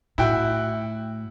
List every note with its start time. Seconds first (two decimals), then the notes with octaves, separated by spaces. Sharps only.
0.18 A2 E4 F#4 G5